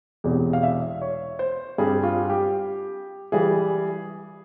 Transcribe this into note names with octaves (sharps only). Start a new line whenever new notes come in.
E1 E2 C3
F5
E5
C#5
C5
G2 G3 C4 G#4
F4
G4
E3 G3 G#4